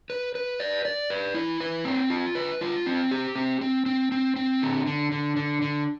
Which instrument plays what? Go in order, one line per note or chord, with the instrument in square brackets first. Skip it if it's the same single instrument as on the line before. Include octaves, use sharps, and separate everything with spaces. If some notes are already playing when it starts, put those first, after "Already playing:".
[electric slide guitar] B4
B4
D5
D5
B4
E4
B4
C4
F4
B4
F4
C4
G4
C4
C4
C4
C4
C4
D3
D3
D3
D3
D3